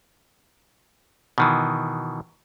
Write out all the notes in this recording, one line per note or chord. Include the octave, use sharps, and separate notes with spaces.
B2 D#3 E3